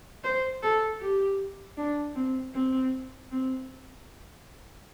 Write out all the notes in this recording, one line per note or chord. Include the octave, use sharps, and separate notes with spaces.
C5
A4
G4
D4
C4
C4
C4